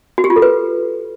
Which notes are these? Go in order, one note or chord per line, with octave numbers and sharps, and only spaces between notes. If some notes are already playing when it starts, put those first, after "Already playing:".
F#4
G4
F4
A4
B4